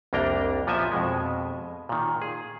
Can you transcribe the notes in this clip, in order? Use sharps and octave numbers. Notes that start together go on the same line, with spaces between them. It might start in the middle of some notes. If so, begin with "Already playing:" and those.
C2 F2 A#3 D4 G5 A#5
A#2 F3 B3 D#5 E5 G#5
F2 B2 G#3
A#2 D#3
G#4